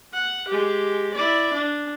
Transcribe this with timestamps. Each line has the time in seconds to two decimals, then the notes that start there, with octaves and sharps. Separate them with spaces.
0.13 F#5
0.49 G#3 G4
1.15 E4 D5
1.54 D4